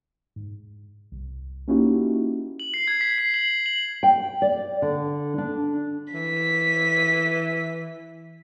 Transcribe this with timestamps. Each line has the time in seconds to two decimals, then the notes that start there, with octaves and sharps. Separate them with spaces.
0.36 G#2
1.12 C2
1.68 A#3 C#4 D#4 E4 F#4 G4
2.60 F#7
2.74 C7
2.88 G#6
3.01 B6
3.18 C7
3.34 F#7
3.66 F#7
4.03 G5
4.42 D5
4.82 D3
5.38 D4
6.13 E3 B6